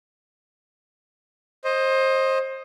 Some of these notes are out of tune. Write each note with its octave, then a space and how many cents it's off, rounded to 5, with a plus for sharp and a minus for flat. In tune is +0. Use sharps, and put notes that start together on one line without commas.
C5 +25 D#5 +0